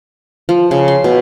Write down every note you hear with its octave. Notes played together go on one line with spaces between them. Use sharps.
F3
C#3
C6
B2